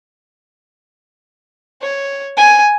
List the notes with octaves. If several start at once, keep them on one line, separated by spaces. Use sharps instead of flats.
C#5
G#5